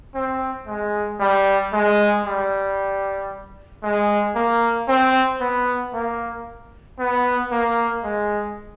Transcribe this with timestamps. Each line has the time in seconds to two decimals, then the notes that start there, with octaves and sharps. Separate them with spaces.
0.15 C4
0.67 G#3
1.20 G3
1.73 G#3
2.25 G3
3.83 G#3
4.35 A#3
4.88 C4
5.40 B3
5.94 A#3
6.99 B3
7.51 A#3
8.04 G#3